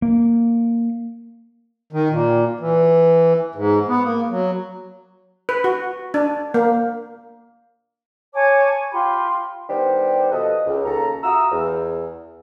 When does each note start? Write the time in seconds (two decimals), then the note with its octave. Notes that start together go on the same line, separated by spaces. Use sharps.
0.02 A#3
1.93 D#3
2.10 A#2
2.60 E3
3.55 G#2
3.89 B3
4.04 A#3
4.30 F#3
5.49 B4
5.64 F#4
6.14 D4
6.54 A#3
8.34 C#5 G#5 A5 D6
8.91 F4 G4 B5 C6
9.69 D#3 G3 B3 D4 G4 C5
10.31 B2 F3 A4 B4 D#5
10.66 C#2
10.85 D#2 C#3 A4 A#5
11.23 F4 F#4 E5 A#5 D#6 E6
11.51 E2